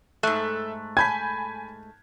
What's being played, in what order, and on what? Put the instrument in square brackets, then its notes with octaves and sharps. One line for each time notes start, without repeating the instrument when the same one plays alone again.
[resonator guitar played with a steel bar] G#2 A3 [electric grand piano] A4 E5 F#6
[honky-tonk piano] G#5 B5 [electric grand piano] A5 G6 B6 [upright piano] G#6